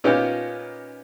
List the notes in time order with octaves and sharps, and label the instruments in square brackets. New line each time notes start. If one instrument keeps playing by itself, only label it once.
[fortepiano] A#2 B3 C#4 D#4 F4 G4